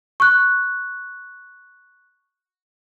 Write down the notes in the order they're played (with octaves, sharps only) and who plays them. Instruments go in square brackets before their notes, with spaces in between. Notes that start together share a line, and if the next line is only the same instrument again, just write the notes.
[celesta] C#6 F#6